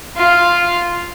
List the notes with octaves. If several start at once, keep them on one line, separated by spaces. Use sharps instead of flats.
F4